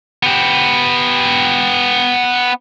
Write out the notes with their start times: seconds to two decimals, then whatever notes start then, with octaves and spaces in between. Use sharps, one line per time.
0.23 B3 G4